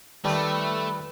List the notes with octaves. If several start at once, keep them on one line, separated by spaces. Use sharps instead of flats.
D#3 G3 A3 C4 B4 A5